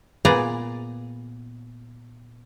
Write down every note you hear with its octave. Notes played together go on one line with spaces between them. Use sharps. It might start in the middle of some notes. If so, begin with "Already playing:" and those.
A#2 B3 G#4 D5 A#5